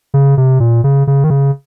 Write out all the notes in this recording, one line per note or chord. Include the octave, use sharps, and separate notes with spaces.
C#3
C3
A#2
C#3
C#3
D#3
C#3